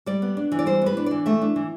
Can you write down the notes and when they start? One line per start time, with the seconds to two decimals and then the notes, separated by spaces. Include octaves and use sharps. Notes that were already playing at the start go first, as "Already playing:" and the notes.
0.06 G3 D5
0.22 B3
0.37 D4
0.52 E3
0.59 D5
0.66 G3 C5
0.82 B3 B4
0.97 D4
1.06 E3 D5
1.26 A3 E5
1.42 D4
1.56 E3